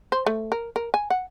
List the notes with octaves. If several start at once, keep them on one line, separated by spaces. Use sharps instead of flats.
C5
A3
A#4
A#4
G#5
F#5